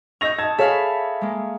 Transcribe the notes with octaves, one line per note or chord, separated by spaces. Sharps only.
D#5 C#6 E6 G6 A#6 F7
D#5 A5 G#6
G#4 A4 C#5 E5 F5 B5
G#3 A#3